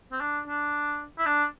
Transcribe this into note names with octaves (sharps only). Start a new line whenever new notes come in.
C4
D4
D4
E4
D4